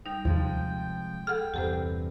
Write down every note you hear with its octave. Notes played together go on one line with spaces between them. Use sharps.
G3 D#4 G5
D#2 C3 F3 G#3
G#4 A4 F#5 F6
E2 G2 C3 G4 A4 C5